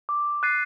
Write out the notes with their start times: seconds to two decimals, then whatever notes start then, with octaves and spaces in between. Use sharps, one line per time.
0.09 D6
0.43 F#6 A6 C7 D#7